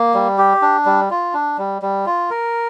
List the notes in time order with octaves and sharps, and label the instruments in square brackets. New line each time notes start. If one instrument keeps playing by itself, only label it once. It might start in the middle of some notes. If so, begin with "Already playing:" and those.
Already playing: [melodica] A#3
G3
G4
D4
G3
F4
D4
G3
G3
F4
A#4